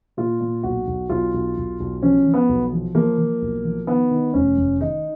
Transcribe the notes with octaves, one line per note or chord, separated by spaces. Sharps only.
A#2 F4
A#2
B1 F#4
B1
B1 F4
B1
B1
B1
F3 C#4
F3
B3
B1
F3
F3 A#3
F3
B1
F3
D#3 B3
D#3
F1 C#4
F1
D#3 D#4